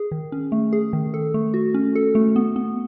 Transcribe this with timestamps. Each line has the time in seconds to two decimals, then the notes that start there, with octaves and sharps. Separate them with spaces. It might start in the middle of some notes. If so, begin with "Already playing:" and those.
Already playing: G#4
0.11 D#3
0.32 C#4
0.52 A3
0.73 G#4
0.93 D#3
1.14 A4
1.34 A3
1.54 F#4
1.74 C#4
1.95 A4
2.15 A3
2.36 B3
2.56 B3